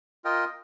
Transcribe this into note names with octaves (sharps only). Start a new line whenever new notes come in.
F4 A#4 D#5 G5